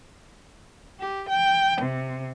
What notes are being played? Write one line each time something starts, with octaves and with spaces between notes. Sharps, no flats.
G4
G5
C3